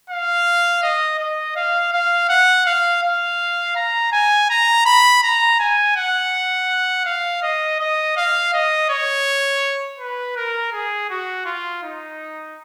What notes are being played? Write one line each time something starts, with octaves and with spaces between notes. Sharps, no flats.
F5
D#5
D#5
F5
F5
F#5
F5
F5
A#5
G#5
A#5
B5
A#5
G#5
F#5
F5
D#5
D#5
F5
D#5
C#5
B4
A#4
G#4
F#4
F4
D#4